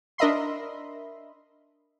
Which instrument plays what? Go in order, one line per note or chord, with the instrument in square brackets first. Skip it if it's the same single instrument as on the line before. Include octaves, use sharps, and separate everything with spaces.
[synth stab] D4 A#4 D#5 E5 B5 C6